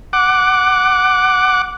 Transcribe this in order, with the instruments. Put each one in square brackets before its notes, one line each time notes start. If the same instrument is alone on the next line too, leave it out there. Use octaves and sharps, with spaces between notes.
[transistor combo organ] F#5 D6